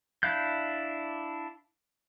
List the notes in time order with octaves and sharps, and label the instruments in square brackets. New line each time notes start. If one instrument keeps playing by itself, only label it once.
[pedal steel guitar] D4 E4 F5 F#6 G6